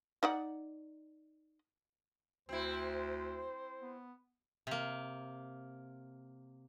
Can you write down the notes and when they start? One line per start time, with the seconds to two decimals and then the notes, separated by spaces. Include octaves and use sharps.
0.23 D#4 D5 F#5
2.49 D2 C4 E4 C5
3.81 B3
4.67 C3 A#3